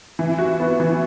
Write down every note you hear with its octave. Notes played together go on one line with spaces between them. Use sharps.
E3
F#4
B3
E3